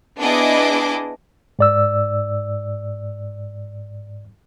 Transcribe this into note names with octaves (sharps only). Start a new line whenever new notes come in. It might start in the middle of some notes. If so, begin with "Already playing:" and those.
B3 D4 E4 G#4 D#5 D6
G#2 D5 E6